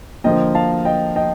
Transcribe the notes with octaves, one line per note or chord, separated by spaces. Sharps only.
D3 F3 A#3 D#5 G5
F5 A5
D#5 G5
D#5 G5